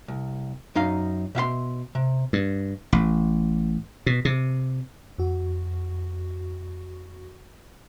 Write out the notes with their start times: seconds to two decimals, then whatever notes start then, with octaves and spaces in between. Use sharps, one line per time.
0.08 C2
0.75 F#2 D#4 F5
1.35 B2 E5 F5 C6
1.95 C3
2.33 G2
2.93 A1
4.06 B2
4.25 C3
5.18 F2 F#4